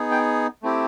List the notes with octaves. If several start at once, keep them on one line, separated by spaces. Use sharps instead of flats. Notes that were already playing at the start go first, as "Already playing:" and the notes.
Already playing: B3 D#4 G#4
G5
A3 C4 E4 G4